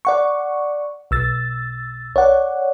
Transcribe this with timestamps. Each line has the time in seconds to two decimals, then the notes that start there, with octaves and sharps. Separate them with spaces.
0.05 D5 F#5 C#6
1.11 B1 E6 A6
2.16 C#5 D5 F#5